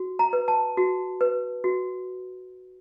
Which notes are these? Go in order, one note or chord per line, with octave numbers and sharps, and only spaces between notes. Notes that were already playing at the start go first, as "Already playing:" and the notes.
Already playing: F#4
A#5
B4
A5
F#4
B4
F#4